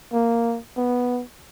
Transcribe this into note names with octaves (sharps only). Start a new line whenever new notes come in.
A#3
B3